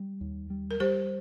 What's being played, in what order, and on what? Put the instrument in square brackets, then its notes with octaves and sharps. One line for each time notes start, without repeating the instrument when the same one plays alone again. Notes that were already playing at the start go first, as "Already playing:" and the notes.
Already playing: [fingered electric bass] G3
D#2
G3
[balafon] A#4
[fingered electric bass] G3 [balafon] G4 C5